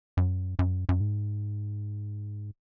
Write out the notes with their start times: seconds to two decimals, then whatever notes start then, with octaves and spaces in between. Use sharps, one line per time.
0.17 F#2
0.59 F#2
0.89 F#2
1.01 G#2